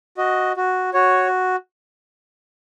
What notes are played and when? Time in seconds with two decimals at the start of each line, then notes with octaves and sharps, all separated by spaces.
0.17 F#4 D#5
0.56 F#4
0.93 F#4 C#5